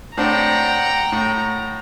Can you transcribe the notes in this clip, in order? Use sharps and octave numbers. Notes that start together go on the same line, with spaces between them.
A2 C4 D4 F#5 G5 A#5
A2